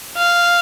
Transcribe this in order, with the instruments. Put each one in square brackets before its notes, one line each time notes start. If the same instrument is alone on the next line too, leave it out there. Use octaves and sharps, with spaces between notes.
[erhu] F5